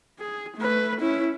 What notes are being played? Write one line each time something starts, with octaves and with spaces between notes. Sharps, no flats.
G#4
A3 B4
C#4 E4